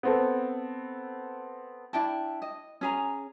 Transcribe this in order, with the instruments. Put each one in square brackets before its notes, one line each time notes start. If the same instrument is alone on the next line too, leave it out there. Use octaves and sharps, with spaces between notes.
[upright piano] B3 C4 A4
[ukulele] D4 E4 G5 A5
D#5
C#4 G#4 A#5